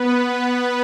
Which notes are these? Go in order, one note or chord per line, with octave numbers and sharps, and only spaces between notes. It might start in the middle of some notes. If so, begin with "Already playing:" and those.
Already playing: B3 B4